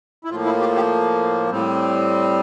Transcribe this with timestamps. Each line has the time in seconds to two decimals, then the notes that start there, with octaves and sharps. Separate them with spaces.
0.24 E4
0.30 A2 F3 A#3 F4
0.45 E4
0.60 G4
0.76 G4
1.51 A2 G3 C4